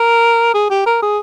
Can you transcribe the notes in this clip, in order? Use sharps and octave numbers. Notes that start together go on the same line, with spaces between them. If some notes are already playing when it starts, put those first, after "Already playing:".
Already playing: A#4
G#4
G4
A#4
G#4